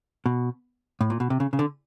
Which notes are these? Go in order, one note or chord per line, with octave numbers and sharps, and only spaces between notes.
B2
A2
A#2
B2
C3
C#3
C#3
D3